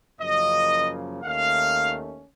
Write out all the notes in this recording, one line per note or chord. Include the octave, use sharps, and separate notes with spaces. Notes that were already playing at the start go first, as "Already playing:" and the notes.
F#2 C#3 F3 A#3 D#5
D#2 D#3 A3 C#4 F5